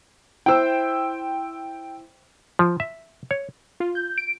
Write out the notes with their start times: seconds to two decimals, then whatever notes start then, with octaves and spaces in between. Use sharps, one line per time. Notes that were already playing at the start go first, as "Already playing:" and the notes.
0.46 E4 C5 G5 E6
2.59 F3
2.80 E5
3.31 C#5
3.80 F4
3.95 G6
4.18 D7